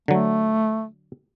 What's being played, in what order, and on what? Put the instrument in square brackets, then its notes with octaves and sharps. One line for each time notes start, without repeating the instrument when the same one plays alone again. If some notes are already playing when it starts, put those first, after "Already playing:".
[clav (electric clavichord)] D3 F#3 [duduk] A3